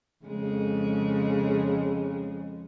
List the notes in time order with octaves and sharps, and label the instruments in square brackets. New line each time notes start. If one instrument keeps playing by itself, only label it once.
[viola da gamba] F2 C#3 G#3